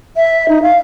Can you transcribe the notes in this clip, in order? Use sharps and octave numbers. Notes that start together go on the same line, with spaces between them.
E5
D#4
F5